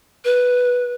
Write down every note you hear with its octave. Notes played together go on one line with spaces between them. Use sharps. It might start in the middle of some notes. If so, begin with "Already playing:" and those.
B4